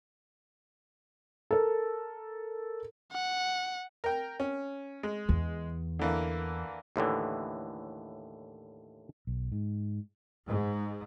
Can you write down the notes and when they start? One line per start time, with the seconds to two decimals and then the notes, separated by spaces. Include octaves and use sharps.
1.51 A4 A#4
3.12 F#5
4.04 A#4 G5
4.40 C#4
5.03 G#3
5.29 E2
5.99 D3 E3 A#3
6.96 D#2 A2 D3 E3
9.27 B1
9.52 G#2
10.48 G#2